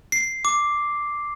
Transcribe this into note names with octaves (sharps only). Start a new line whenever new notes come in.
C7
D6